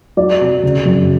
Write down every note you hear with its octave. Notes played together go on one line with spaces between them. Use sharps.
F#3 D5
C3
C#3
F#2